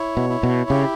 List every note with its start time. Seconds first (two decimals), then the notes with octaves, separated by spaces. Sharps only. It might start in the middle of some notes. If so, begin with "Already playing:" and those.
Already playing: E4 C#5
0.17 B2
0.30 E4
0.43 B2
0.69 C#3 G4